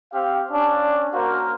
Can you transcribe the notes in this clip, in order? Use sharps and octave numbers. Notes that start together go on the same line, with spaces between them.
C4 G4 F5
C#4 D4
A#3 F#4 A#4 C5 F5